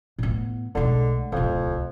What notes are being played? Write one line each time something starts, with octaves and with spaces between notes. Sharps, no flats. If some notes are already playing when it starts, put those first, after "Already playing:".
A2 B3
B1 D3 G#3
D1 C2 F2